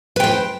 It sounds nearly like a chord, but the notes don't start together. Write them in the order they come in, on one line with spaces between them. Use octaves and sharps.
B4 G5 C5